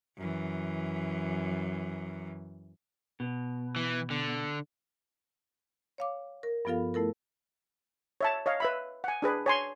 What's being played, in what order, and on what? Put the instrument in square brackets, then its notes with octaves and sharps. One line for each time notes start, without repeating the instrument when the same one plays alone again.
[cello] F#2 E3
[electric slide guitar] B2
[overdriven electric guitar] E3
D3
[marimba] C#5 F5 D6
A#4
G2 F3 B3 F4 A4 F5
A3 E4 A4 A#4
[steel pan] C#5 E5 A5
C#5 D#5 F5
B4 E5 B5
F#5 G#5
D4 G#4 B4
C#5 G#5 C6